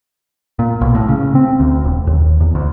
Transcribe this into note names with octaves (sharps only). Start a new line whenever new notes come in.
A#2
B1
A2
C#3
C4
D2
D#1
D#2
E2
D2